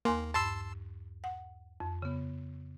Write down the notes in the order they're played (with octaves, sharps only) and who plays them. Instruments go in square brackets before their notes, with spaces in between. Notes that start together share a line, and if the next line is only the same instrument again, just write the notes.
[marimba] D#2 G#5 C6 [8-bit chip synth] A#3
[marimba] G2 [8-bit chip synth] A5 C6 E6
[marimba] F#5
F2
C#3 B3